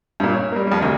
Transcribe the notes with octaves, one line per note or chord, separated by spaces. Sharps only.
G2 A#2
C#5
G3 A#3
F2 G3
D2 C3